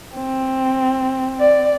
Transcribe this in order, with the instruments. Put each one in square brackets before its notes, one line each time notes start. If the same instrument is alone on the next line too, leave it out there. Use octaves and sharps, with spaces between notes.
[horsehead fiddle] C4
[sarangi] D5